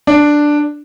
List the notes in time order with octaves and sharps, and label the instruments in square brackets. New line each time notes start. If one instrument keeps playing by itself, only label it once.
[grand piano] D4